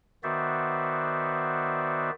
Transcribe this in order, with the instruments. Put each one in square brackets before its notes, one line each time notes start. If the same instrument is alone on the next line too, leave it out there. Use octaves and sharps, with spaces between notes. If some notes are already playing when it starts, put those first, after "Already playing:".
[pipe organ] D#3 B3 F#4 C5 D5 E5